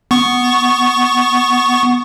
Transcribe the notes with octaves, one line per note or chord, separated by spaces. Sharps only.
B3 C#6